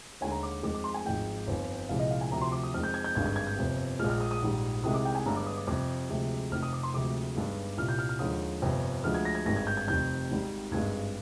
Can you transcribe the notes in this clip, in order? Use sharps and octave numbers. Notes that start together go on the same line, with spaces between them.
D#2 D3 G#3 G#5
A#5
D6
F2 D#3 G#3 D6
D6
C6
G#5
G#1 G#2 F3 G#3 G5
G1 F2 D#3
C2 A#2 F3 G#3 F5
D#5
F5
G#5
D2 C3 F3 A#5
C6
D6
D#6
F2 D#3 G#3 F6
G6
G#6
G6
G#1 G2 D3 G#3 G#6
G#6
G#6
G6
G1 F2 C3
A#1 A#2 G#3 F6
F6
D#6
D#6
A#1 G#2 D#3 G3
C2 C3 D#3 G#3 D#6
D6
G5
G#5
G1 G2 D3 G#3 A#5
D6
D#6
D6
F2 C3 G3 D6
D2 C3 F3 G#3
F1 F2 D#3 F6
D#6
D6
C6
D2 C3 F3 G#3 D6
G1 G2 D#3 G#3
C2 A#2 G3 F6
G6
F6
F6
D#2 D3 F3 G#3 D#6
G1 F2 C3 G3
D2 D3 F3 G#3 F6
G#6
A#6
G#6
G#1 G2 D#3 G#3 A#6
G#6
G6
G#6
F1 F2 D#3 G3 G6
G#1 G#2 D#3 G3
G#1 G2 D#3 G#3 G#6